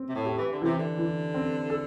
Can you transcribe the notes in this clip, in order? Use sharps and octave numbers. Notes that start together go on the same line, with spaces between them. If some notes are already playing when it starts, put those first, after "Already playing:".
Already playing: C4
C3
A2
G4
E3
D3
C3 E3
D3
E3
C4
A4